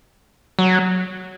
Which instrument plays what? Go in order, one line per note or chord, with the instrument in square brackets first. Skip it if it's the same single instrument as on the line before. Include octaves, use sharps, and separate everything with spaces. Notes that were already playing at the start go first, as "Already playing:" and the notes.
[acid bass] F#3